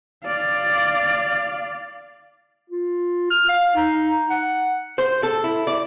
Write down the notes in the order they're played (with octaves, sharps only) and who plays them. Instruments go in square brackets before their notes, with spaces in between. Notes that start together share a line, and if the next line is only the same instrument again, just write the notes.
[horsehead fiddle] D5 F5
[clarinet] F4
F6
F5
D#4
F#5
[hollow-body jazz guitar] C5
A4
E4
D5